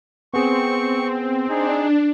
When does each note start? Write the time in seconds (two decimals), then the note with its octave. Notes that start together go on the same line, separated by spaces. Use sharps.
0.34 B3 C4 G#4 C#6
1.49 D4 D#4 G#4